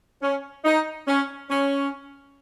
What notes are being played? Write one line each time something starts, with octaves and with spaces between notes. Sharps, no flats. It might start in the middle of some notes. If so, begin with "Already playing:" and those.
C#4
D#4
C#4
C#4